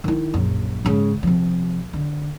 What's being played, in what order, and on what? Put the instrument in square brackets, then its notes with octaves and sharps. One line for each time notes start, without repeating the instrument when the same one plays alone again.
[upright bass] D#3 E4
A#1 F#2
G#2 C#3
C3 F3
D3